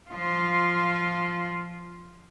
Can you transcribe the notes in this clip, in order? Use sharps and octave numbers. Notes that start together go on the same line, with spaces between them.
F3 F4